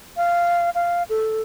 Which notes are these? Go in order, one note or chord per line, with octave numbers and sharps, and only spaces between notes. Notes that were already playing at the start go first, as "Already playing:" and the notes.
F5
F5
A4